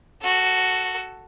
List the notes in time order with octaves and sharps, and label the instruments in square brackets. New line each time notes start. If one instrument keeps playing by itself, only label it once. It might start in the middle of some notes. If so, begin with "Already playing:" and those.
[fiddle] F#4 A4